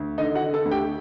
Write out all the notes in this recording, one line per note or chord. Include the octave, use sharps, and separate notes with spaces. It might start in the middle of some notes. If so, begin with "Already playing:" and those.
Already playing: D2
D3 D#4 D#5
F#4 F#5
D3
A4 A5
D2
G4 G5